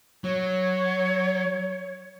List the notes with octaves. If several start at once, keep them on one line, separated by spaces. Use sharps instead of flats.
F#3 C#5